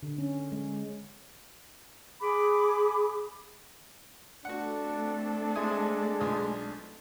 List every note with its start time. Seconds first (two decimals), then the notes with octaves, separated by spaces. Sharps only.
0.03 D3
0.18 C#4
0.52 G#3
2.20 G#4 B5 D6
4.45 A3 C4 D4 F#4 A4 F#5
5.56 G#3 E4 G#5 D#6
6.20 B1 F4 D#6